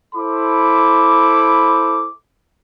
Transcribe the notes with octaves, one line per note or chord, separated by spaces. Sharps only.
E4 A4 C5 B5 D6